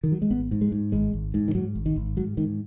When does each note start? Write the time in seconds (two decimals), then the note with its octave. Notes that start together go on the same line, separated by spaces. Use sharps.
0.04 D#3
0.12 F#3
0.22 G#3
0.30 G#1 B3
0.51 G#2
0.61 G#3
0.72 G#2
0.92 G#1 G#3
1.13 G#1
1.34 G#2
1.48 D#3
1.55 G#2 F#3
1.75 G#1
1.86 D#3
1.96 G#1
2.17 G#2 F#3
2.37 G#2 D#3